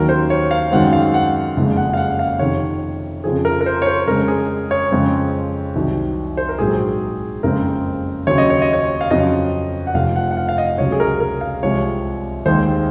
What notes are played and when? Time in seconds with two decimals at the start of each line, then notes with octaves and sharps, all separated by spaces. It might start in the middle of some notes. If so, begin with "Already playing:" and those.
Already playing: D#2 D#3 F#3 C#4 A#4
0.09 C5
0.30 C#5
0.51 F5
0.72 F#2 D#3 G#3 C4 F#5
0.93 F5
1.14 F#5
1.56 F#1 F2 C#3 G#3
1.77 F#5
1.93 F5
1.97 F#5
2.19 F5
2.39 F2 C3 D#3 C#5
3.24 F2 C#3 F3 C4 G#4
3.45 A#4
3.61 A#4
3.66 C5
3.82 C#5
3.86 C5
4.07 F2 C#3 G#3 A#4
4.28 G#4
4.71 C#5
4.91 F2 C#3 G#3 C4
5.75 C2 C3 D#3 F#3
6.37 C5
6.49 A#4
6.59 A#1 G#2 F#3 C4 G#4
7.43 F#1 F2 C#3 G#3 C4 A#4
8.27 D#2 C#3 F#3 C4 C#5
8.38 D#5
8.50 C#5
8.62 D#5
8.73 C#5
9.01 F5
9.11 F2 C#3 F#3 D#5
9.87 F#5
9.94 F1 F2 C3 F3 F5
10.16 F#5
10.31 F#5
10.37 F5
10.49 F5
10.58 D#5
10.78 C#2 C3 F#3 C#5
10.92 G#4
11.00 A#4
11.20 A#4
11.41 F5
11.63 C2 C3 F3 G#3 C#5
12.46 D#2 D#3 G#3 C4 C5